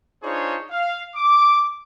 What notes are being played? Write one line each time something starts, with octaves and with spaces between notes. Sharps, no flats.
D4 D#4 F4 G#4 C5 C#5
F5
D6